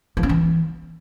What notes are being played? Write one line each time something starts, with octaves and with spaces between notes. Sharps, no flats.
F3
C#4
E3